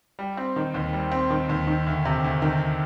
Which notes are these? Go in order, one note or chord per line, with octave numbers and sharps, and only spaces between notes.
G3
C4
D#3
D#2
G3
C4
D#3
D#2
D#3
D2
C3
D2
D#3